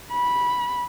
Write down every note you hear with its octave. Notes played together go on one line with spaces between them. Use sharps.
B5